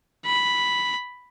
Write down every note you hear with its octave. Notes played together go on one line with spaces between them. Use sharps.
B5